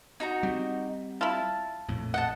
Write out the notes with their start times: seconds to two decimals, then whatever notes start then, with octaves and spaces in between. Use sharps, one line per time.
0.20 D#4 F#4 A#5
0.43 G3 C4
1.21 E4 F4 A5
1.89 A#1 F2 A2
2.14 D#5 F#5 G5 A5